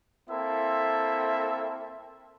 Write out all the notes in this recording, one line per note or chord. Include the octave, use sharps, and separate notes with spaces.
A#3 C4 E4 A4 E5